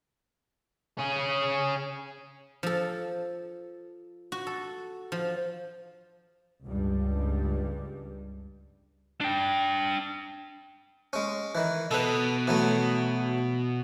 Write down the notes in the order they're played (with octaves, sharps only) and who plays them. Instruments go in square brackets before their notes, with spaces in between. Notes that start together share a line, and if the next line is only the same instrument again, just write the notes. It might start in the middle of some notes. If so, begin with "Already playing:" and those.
[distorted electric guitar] C#4 G#4
[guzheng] F3 A4
F#4
A4
F3
[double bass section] C#2 G2 G3
[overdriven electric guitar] D4 G5
[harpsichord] G#3 C#4
D#3 E3
[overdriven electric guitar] B2 [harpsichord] A4 B4
[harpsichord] E3 F#3 A3